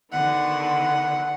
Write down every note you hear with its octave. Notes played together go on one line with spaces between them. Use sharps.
D3 D#3 B3 F#5